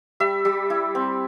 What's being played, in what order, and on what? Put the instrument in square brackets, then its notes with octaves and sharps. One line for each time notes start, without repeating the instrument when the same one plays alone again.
[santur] G3 E5
G3
E4
C4